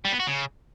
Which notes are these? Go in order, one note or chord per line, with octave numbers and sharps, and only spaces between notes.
G3
B3
F#4
C#3